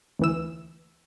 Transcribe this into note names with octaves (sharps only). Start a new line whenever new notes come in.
D2 E3 E6